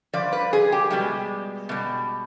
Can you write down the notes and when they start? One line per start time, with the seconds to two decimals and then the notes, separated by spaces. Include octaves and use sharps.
0.13 G2 F3 D5
0.33 B4
0.53 G#4
0.72 G4
0.91 B2 G3 G#3
1.69 B2 G3